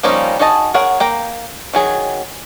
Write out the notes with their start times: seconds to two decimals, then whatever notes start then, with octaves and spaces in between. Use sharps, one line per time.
0.03 F3 G3 A#3 C#4 D#4
0.39 D#4 F#4 G#4 D#5 A5
0.74 G#4 A#4 C#5 F#5
1.00 A#3 G5 A#5
1.73 D#3 F#3 G#4